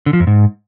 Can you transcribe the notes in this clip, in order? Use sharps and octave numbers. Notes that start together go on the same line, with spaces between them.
D3
F3
F2
G#2